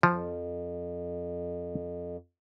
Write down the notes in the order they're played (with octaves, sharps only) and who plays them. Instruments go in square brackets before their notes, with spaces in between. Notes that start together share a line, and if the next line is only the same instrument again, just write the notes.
[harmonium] F2 [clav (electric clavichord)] F3